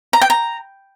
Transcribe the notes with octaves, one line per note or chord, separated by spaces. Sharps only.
A#5
G5
A#5